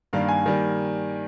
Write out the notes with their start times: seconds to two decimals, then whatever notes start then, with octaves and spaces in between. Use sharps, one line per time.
0.13 G2 D#3 G3 A#3 F5
0.29 G#5
0.46 D#3 G3 A#3